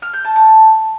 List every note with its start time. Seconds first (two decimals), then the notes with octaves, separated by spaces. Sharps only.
0.02 F6
0.13 G6
0.25 A5
0.36 A5